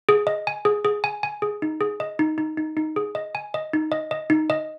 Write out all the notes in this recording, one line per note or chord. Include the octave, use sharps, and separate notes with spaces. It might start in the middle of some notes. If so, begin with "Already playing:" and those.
G#4
D#5
G#5
G#4
G#4
G#5
G#5
G#4
D#4
G#4
D#5
D#4
D#4
D#4
D#4
G#4
D#5
G#5
D#5
D#4
D#5
D#5
D#4
D#5